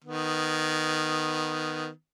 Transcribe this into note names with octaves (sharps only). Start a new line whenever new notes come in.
D#3 B3